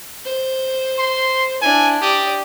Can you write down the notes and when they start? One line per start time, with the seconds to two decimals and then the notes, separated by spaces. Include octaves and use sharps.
0.25 C5
0.99 C6
1.62 D4 E4 G#5
2.02 G4 D5 D#6